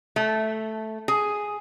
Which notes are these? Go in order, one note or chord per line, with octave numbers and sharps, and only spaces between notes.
A3
G#4